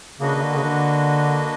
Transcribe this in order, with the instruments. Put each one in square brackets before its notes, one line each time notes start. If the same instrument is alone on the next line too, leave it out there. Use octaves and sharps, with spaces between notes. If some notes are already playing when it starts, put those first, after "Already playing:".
[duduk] C#3 [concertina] A#3 D4 F#4 B4 D#5
[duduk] C#3
D3
C#3
D3